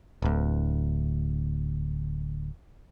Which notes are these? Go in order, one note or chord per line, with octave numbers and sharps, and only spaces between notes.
D1 D2